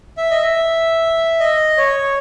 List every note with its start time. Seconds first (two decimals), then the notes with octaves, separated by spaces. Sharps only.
0.17 E5
0.31 D#5
0.42 E5
1.40 D#5
1.77 C#5